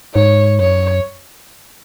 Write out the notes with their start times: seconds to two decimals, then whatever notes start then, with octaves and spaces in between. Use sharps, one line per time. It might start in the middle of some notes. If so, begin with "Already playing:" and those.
0.15 G#2 C#5
0.60 F#2 C#5